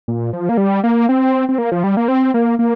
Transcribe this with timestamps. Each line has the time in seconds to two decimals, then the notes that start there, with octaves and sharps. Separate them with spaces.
0.08 A#2
0.33 F3
0.49 A#3
0.57 G3
0.84 A#3
1.09 C4
1.49 C4
1.58 A#3
1.72 F3
1.84 G3
1.97 A#3
2.08 C4
2.34 A#3
2.59 A#3